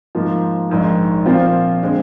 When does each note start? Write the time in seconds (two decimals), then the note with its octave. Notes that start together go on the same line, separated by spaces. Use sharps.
0.15 G#2 F3 A#3
0.70 A#1 G#2 D#3
1.26 A#2 F3 C4 F4
1.83 D3 G#3 C4